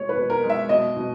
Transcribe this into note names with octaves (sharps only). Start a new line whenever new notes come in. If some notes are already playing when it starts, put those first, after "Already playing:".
Already playing: B2 G#3 C#5
B4
B2
A#4
G#3
E5
B2 D#5
B2